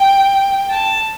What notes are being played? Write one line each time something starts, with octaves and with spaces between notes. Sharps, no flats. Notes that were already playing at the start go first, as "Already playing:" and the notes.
Already playing: G5
A5